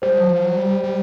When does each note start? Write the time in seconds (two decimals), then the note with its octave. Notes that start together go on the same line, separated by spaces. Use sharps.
0.02 G3 C5
0.16 F#3
0.30 F3
0.43 F#3
0.57 G3
0.84 G3